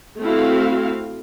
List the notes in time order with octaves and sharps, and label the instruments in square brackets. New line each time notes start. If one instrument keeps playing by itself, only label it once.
[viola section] A3 C4 E4 F#4 F5